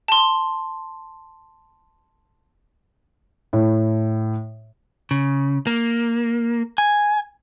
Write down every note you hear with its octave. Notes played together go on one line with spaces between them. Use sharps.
A5 C6
A2
C#3
A#3
G#5